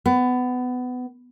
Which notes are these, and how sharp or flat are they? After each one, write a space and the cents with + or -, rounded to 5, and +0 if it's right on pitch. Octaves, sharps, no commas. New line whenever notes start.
B3 +20